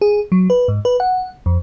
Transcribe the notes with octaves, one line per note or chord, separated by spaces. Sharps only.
G#4
F#3
B4
G#2
B4
F#5
F2